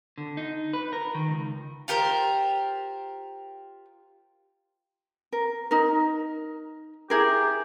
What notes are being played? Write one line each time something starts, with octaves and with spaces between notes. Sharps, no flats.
D3
D#4
B4
A#4
D#3
C#2
F4 G4 A#4 C5
A#4
D#4 A#4
E4 G4 G#4 A#4